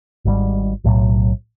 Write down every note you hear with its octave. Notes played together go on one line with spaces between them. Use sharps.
G#1 G#2 D#3 G3
B1 A2 F#3